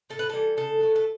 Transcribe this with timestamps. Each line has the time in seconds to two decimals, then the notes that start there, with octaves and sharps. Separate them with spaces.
0.10 A2 A4
0.19 B4
0.30 E3 G3 A4
0.57 C#3 A4
0.80 F#3 A3
0.96 A4